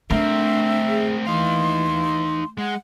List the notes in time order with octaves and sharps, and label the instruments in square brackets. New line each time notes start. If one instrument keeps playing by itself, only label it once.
[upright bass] A3 [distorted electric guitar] C4 A#4 [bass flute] D4 [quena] E5
[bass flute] G#4
[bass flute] E3 [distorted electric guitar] D#4 F5 [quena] C6
[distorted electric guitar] G#3 [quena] F#5